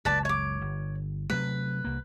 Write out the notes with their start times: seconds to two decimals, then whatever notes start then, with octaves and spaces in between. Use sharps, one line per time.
0.05 F#1 C#2 B4 D5 A5
0.25 C#5 D6
0.61 G1
1.30 C3 F#3 A3 B4
1.84 C2 A#3